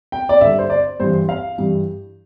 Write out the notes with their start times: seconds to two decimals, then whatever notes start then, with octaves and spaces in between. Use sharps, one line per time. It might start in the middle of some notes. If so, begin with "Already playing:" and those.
0.12 G5
0.29 D5
0.41 G2 D3 E5
0.59 C5
0.70 D5
1.00 G2 E3 C5
1.29 F5
1.58 G2 E3